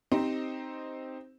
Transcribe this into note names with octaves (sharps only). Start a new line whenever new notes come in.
C4 D#4 G4 C5